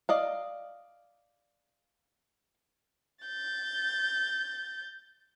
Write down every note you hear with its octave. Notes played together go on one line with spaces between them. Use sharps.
D5 D#5 F5
G6 A6